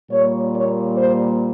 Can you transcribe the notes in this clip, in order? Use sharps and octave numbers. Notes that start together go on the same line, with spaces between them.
A#2 G3 A#3 C#5
C#5
C5